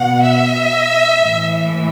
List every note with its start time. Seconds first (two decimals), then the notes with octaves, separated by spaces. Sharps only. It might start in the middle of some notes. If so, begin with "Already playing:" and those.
Already playing: B2 F#5
0.23 E5
1.19 A2 E3